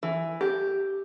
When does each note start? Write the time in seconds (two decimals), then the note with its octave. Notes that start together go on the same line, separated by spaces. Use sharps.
0.03 E3
0.41 G4